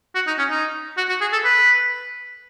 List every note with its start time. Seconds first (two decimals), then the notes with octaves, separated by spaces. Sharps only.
0.15 F#4
0.27 D#4
0.39 C#4
0.51 D#4
0.97 F#4
1.09 F#4
1.21 G#4
1.33 A4
1.44 B4